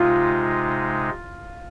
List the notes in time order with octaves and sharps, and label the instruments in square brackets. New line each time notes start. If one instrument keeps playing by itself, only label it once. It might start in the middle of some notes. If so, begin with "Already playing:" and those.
Already playing: [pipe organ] C3 G#3 D#4 [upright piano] F4